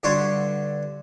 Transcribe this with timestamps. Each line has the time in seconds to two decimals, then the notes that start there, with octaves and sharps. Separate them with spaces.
0.03 G2 D3 F#4 C#5 C6